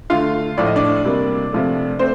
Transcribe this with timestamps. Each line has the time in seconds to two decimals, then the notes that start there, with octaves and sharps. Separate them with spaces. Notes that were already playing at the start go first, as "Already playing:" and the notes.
0.10 D3 A3 F4 F5
0.57 A2 F3 A3 D5
0.66 D#5
0.76 D4 D5
1.05 C3 G3 A#3
1.52 C3 F3 A3
1.99 A3 C4 C5